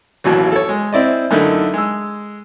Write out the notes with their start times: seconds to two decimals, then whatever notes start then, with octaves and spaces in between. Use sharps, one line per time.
0.24 A1 D#2 B2 E3 F#3
0.52 A4 C#5
0.69 G#3
0.93 C4 E4 D5 D#5
1.31 F#2 D3 A3 A#3 D#4 E4
1.74 G#3 E6